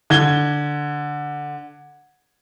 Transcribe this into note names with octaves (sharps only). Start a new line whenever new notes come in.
D3 G#6 G7